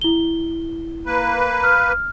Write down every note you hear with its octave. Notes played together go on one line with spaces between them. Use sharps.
E4 G7
A#3 B4
F6